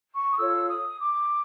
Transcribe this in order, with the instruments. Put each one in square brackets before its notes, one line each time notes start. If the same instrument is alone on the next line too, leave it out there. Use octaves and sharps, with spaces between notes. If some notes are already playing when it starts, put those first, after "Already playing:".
[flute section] C#6
D#6
F4 A4 C#5 E6
D#6
D6